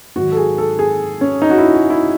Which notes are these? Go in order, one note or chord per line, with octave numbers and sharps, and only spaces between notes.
G#2 D#3 F#3 F#4
A4
G#4
A4
G#4
C#4
D#4
F#4
E4
F#4
E4